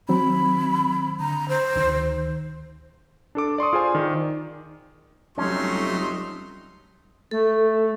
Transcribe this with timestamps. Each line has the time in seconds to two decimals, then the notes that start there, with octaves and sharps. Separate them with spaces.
0.09 D#3 F#3 C4 B5
1.20 D3 A#5
1.49 C5
1.76 D2 D#3
3.35 D4 A4 D6
3.58 D5 C6 C#6 D#6
3.73 F4 G#4 C5 G#5
3.94 D#3 D5
5.38 F1 F#3 G3 A3 C#4 D#4 C6
7.31 A3 A4